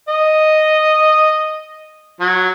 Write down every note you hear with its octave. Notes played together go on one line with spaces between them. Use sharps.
D#5
F#3